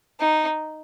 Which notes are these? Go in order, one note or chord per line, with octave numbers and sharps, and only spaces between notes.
D#4